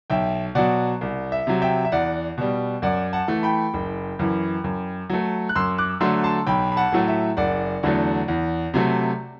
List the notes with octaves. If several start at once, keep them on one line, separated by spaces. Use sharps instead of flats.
B1 E5 G5
B2 F#3 D5 F#5
C2
E5
C3 F#3
E5 G5
E5
E2 D5 F#5
B2 G3
F#2 D5 F#5
F#5 A5
E3 A3
G5 B5
F#1
F#2 E3
F#2
F#3 A3
F#6
F#2 C6 E6
D6 F#6
D3 F#3 A3 C6 E6
A5 C6
B1 G5 B5
B5
F#5 A5
A2 F#3 A3
E5
F#1 D5 F#5
E2 D3 F#3 A3
E2
C3 F#3 A3